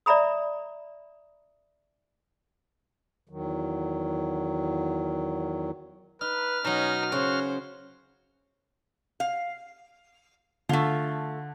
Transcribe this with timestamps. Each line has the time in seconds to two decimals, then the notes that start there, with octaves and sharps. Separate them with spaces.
0.06 D5 E5 A#5 B5 D#6
3.29 E2 D#3 F#3
6.21 D#4 B4 F6
6.65 B2 F#3 C#4 D#4
7.12 C#3 C#4 F#4 C5
9.20 F5
10.69 D3 A3 F4